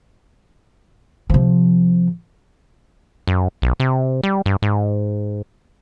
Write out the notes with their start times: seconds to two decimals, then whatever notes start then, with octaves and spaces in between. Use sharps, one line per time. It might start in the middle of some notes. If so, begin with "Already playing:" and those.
1.30 C3 F3
3.27 F#2
3.62 B1
3.80 C3
4.23 G3
4.46 G2
4.62 G#2